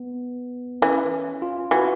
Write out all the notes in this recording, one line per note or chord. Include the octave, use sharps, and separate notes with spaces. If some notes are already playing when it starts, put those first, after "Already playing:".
Already playing: B3
E3 C#4
F4
E3 F#4